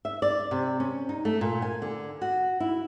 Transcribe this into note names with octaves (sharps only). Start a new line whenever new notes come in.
E5
D5
C3
C#4
D#4
A3
A#2
G#5
D3
F#4
E4